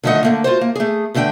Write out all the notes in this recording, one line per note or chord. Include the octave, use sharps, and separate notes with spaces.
D3 D#3 F3 A3 D#5 F#5
D3 A3 A#3
F4 F#4 C5
A#3
A3 G#4
E2 D3 A3 D4 G5